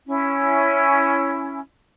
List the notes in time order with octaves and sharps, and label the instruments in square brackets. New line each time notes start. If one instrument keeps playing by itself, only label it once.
[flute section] C#4 E4